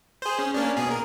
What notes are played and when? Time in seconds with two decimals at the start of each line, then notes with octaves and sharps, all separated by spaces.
0.22 G#4 C5
0.39 C#4
0.54 A#3 C#4 D4
0.77 B2 G#4
0.91 A#4